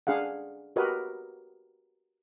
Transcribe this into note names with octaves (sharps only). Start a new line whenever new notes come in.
D4 G#4 F5 F#5
F#4 G4 A#4 B4 D#5